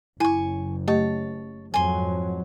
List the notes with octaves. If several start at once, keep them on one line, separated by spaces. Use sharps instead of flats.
F#1 E4 G#5 C#6
A3 G4 C#5 D#5 A5
F2 G#2 F#3 G#5 C6